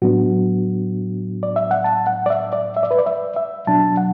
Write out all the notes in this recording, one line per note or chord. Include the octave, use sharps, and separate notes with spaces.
A2 F#3 B3 D4 F#4
D5
E5
F#5
A5
F#5
D5
E5
D5
E5
D5
B4
D5
E5
E5
B2 F#3 D4 A5
F#5